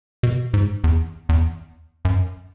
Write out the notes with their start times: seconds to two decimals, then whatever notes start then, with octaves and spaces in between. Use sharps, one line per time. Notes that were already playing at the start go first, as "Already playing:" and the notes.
0.23 B2
0.54 G#2
0.84 E2
1.29 E2
2.05 F#2